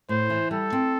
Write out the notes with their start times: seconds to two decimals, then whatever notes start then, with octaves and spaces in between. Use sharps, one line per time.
0.09 A2 C5
0.30 E3
0.51 G3 A4
0.72 C4